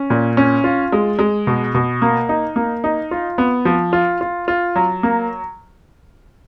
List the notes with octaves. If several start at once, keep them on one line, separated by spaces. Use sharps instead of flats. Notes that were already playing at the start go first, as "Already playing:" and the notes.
Already playing: C#4
A#2
C#4
F4
G#3
G#3
B2
B2
A#3
D#4
A#3
D#4
F4
B3
F3
F4
F4
F4
F#3
A#3